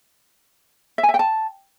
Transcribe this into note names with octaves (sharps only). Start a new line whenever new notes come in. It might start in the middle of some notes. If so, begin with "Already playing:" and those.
E5
G#5
E5
G5
A5